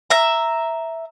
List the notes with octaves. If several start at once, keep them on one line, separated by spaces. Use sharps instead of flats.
E5 A#5